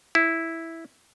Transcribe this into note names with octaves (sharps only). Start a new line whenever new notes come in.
E4